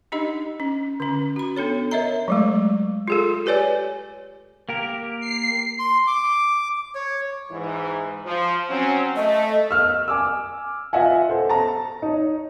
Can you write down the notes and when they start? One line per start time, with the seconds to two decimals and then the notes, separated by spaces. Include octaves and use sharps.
0.12 D4 D#4 G4 D#5
0.60 C#4
1.00 D3 C#4
1.36 F#4 B5
1.56 B3 D4 A4 C#5
1.91 A#4 C#5 D#5 E5 A#5
2.28 F#3 G#3 A3
3.08 F4 G#4 A4
3.46 G4 B4 C#5 D5 G#5
4.69 A#3 G4 A#4
5.20 C7
5.79 C6
6.07 D6
6.95 C#5
7.51 G#2 E3
8.25 F3
8.69 F#3 C4 C#4
9.16 A3 D#5
9.71 E6 F6
10.08 G#5 D6 E6
10.93 F4 D#5 E5 F#5 G#5
11.29 A4 C5
11.49 A5 A#5
12.02 D#4 C#5